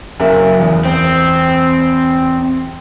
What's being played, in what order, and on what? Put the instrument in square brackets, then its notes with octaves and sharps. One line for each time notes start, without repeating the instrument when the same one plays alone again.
[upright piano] F#1 A#3 E5
E2
[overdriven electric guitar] C4